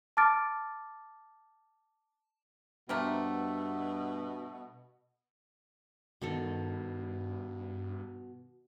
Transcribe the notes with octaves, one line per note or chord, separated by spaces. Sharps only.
A5 D6 F6 A6 D7
G2 B2 A3 A#3 C4
G2 B2 D#3 A4